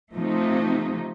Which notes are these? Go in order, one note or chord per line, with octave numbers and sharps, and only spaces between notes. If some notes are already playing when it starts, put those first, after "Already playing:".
C3 F3 A3 D#4